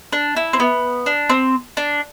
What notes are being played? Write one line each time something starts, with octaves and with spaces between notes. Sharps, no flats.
D4
E4
C4
B3
D4
C4
D4